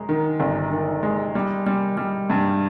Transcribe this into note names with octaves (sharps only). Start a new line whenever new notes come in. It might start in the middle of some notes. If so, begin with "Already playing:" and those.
Already playing: F#2 G#3
D#3
G1
D#3
G#3
G3
G3
G3
G2